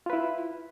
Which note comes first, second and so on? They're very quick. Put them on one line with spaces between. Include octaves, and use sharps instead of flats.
F4 B4 E4